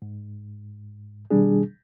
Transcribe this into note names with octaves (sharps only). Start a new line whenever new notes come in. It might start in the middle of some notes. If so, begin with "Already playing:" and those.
G#2
B2 D#3 G3 D4 G#4